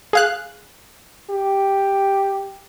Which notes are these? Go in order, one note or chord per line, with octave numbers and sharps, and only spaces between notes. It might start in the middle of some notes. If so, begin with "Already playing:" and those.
G#4 F5 F#6
G4